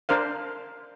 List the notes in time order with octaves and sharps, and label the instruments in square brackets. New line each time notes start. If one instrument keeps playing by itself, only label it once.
[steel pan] D4 A#4 C5 F5